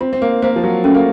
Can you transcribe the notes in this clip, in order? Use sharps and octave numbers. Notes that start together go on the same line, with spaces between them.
C4 F4
C4
A#3
A#3 C5 F5
F3
F#3
A3 C#4
A#3